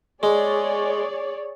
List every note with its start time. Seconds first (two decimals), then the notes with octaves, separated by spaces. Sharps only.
0.23 G#3 G#4 C#5 D5